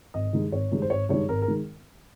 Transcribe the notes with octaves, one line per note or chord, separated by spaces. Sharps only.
G#1 D#5
G2 D#3 G#3 D#4
G#1 C#5
G2 D#3 G#3 D#4
C5
G#1 C#5
G2 D#3 G#3 D#4 C#5
G#1 A#4
A#4
D#3 G#3 D#4